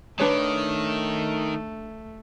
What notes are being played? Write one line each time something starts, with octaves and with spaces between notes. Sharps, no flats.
D#3 A3 D4 B4 C#5